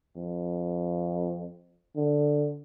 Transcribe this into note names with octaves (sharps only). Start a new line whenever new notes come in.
F2
D3